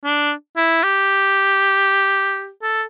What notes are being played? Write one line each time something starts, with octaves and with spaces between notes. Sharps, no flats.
D4
E4
G4
A4